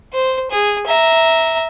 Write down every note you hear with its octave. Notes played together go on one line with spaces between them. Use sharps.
C5
G#4
E5 A#5